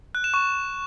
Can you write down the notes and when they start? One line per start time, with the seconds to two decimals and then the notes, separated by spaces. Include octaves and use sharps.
0.15 F#6
0.24 E7
0.34 C#6